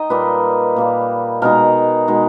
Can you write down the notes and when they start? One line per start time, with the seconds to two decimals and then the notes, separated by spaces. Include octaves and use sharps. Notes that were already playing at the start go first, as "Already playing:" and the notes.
Already playing: D#4 D#5 G5
0.10 A#2 G3 A#3 B4
0.76 A#2 G3 A#3
1.42 B2 G#3 D#4 A#4
2.08 B2 G#3 D#4